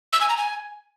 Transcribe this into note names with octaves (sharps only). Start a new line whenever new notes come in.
E6
G#5
A#5
G#5